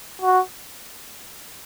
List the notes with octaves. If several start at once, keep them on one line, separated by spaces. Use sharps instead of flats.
F#4